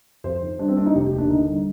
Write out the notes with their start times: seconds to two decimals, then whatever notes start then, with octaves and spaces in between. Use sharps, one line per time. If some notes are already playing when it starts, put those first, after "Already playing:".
0.24 F2 C5
0.42 D#3
0.59 G3 D4
0.68 C4
0.77 A#3 D4
0.86 D#4
0.94 F1 G4
1.06 G4
1.13 D#2
1.18 D4
1.30 D3 D#4
1.48 G3